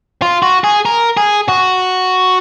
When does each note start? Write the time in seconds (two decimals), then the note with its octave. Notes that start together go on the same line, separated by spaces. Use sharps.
0.22 F4
0.42 F#4
0.64 G#4
0.86 A#4
1.17 G#4
1.48 F#4